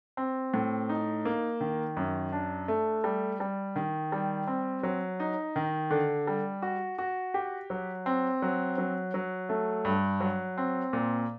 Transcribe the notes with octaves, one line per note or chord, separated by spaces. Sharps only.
C4
A2
D#4
A#3
D#3
F#2
D4
A3
G3
G3
D#3
G3
C4
F#3
D#4
D#3
D3
G3
F#4
F#4
G4
F#3
C4
F#3
F#3
F#3
A3
G2
F#3
C4
A#2